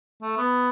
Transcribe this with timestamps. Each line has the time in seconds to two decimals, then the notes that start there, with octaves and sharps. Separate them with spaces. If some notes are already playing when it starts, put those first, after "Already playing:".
0.22 A3
0.37 B3